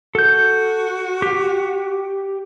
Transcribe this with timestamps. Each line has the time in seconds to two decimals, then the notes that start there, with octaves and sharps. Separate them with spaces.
0.15 F#4 A4 G6
1.22 G4